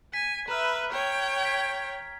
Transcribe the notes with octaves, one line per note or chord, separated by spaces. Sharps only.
G#5 B6
B4 E5 A#5 F6
C#5 G5
G#6 B6